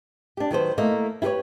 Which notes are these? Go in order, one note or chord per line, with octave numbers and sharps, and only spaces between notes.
D4 G4
D#3 F#3 B4 C5
A3 A#3 E4 A#4 D#5
E4 G4 G#4 B4 C#5